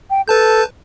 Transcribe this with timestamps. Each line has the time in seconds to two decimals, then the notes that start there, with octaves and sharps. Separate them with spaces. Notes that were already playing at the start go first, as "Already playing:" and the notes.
0.10 G5
0.28 A4 B4 A5 G6